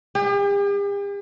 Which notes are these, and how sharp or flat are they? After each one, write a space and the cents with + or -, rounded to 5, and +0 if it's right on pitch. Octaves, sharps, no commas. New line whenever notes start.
G4 +45